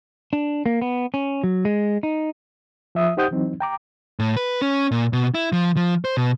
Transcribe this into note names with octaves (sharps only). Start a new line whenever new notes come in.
D4
A#3
B3
C#4
F#3
G#3
D#4
F3 E5 D#6
D#4 G4 C5 F#5 D#6 G6
E3 F#3 C4 D#4
G5 A#5 D6
A2
B4
C#4
A#2
B2
E4
F3
F3
C5
B2